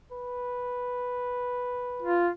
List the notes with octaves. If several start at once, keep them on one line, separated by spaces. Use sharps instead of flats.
B4
F4